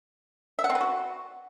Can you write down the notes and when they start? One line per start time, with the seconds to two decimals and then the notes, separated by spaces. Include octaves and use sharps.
0.59 E5
0.64 F#5
0.70 C4
0.75 B4
0.81 F#4